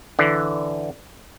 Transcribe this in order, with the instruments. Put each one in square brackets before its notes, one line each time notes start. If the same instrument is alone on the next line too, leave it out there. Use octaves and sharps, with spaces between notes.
[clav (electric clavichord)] D3 E3